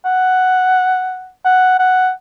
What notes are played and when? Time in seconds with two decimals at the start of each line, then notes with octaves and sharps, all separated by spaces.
0.05 F#5
1.45 F#5
1.79 F#5